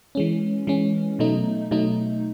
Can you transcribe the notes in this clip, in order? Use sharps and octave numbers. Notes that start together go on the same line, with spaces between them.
E3 G#3 C#4
E3 G#3 C#4
B2 F#3 A3 D#4
B2 F#3 A3 D#4